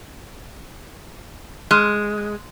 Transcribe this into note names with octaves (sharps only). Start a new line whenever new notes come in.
G#3 C6 F6 F#6